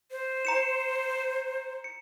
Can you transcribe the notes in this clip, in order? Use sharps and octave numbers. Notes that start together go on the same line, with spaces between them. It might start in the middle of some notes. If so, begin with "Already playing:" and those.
C5
A#5 C#7 E7
C#7